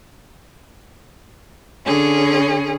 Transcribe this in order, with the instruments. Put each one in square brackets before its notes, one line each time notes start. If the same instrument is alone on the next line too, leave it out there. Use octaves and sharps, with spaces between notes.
[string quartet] D3 C#4 G#4